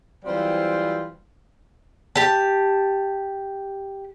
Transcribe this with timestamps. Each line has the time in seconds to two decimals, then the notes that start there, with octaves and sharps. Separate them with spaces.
0.25 E3 F#3 G3 C4 F4 C5
2.16 G4 A5